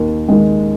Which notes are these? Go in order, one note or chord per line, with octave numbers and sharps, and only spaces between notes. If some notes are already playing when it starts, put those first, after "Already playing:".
Already playing: D#2 D#3
D#3 G#3